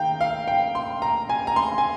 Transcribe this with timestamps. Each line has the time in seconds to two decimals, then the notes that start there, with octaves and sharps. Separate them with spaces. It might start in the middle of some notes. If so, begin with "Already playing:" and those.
Already playing: D#3 F5 G5 A#5
0.21 F5
0.48 G5
0.75 C6
1.02 A#5
1.29 G#5
1.47 A#5
1.56 C6
1.78 G#5